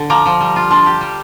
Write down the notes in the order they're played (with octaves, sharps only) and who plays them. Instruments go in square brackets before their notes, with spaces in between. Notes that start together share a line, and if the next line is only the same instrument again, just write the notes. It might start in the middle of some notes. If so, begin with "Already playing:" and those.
Already playing: [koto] D3
[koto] F3 [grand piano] A#5 D6
[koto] F3
G3
F4
[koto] D4 [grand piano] A5 C6
[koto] G4
G3